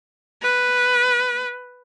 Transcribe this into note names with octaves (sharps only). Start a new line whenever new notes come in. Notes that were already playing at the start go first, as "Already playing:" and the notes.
B4